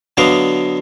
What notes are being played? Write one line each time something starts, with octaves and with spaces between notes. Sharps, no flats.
D3 F#3 B3 D#5 F5 D6